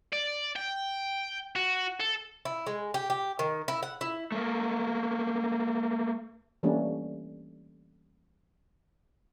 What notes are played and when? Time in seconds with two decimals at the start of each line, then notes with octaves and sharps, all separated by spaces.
0.13 D5
0.56 G5
1.56 F#4
2.00 A4
2.45 E4
2.67 G#3
2.94 G4
3.10 G4
3.39 D#3
3.68 E4
3.83 F#5
4.01 E4
4.32 A3 A#3
6.63 E3 G3 A3 A#3 C#4 D4